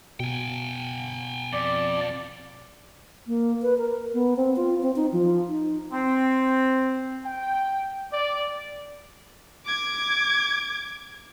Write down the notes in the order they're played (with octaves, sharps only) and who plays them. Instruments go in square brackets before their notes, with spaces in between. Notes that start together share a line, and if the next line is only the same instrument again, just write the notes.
[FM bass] B2 [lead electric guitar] G5 G#5
[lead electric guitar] F2 [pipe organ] D5
[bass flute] A#3
B4
A#4
B3
C4
F4
C4
D#4
F3
D#4
[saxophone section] C4
[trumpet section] G5
D5
[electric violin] D6 G#6